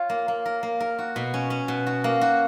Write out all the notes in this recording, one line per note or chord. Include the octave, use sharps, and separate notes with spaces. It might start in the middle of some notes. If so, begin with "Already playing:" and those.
Already playing: F4 C#5
A#3
A#3
A#4
A#3
A#4
F#4
B2
C#4
C#4
B2
F#4
A#3
F#4